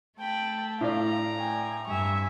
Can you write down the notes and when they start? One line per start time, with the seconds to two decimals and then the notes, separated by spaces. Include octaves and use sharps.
0.19 A3 G5 A5 B5
0.81 A2 D5 F5 A#5
1.38 G5 G#5
1.87 G2 E5 G#5 C#6